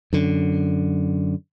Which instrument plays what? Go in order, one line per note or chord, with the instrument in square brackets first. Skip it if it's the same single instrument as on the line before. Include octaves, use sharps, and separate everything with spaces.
[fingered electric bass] F#2 D3